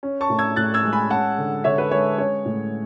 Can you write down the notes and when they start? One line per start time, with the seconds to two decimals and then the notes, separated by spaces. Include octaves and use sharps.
0.03 C#4
0.21 A5 C#6
0.30 A2
0.39 E6 G#6
0.56 A2 F#6 A6
0.74 E6 G#6
0.83 G#3
0.93 G#5 B5
1.10 C#4 F#5 A5
1.38 D3
1.64 D3 C#5 E5
1.78 B4
1.91 G#3 C#5
2.18 C#4 C#5
2.45 A2